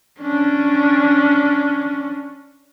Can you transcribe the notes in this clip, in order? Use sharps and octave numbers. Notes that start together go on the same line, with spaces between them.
C#4 D4